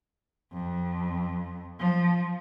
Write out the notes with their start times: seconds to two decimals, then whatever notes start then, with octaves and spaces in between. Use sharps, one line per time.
0.53 F2
1.80 F3